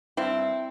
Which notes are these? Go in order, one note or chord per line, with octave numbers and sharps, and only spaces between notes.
G2 C4 E4